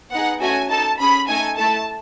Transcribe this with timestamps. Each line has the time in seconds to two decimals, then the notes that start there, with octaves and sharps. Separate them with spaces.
0.12 B3 D#4 G#4 F#5
0.41 A3 C#4 F#4 A4 G#5
0.69 D#4 A4 A5
1.00 C#4 G#4 B5
1.28 A3 D#4 A4 G#5
1.57 A3 E4 A4 A5